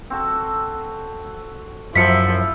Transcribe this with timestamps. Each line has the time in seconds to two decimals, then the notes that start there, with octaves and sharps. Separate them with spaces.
0.10 C4 F#4 A4
1.95 F#2 F3 E4 E5 F5 B6 C#7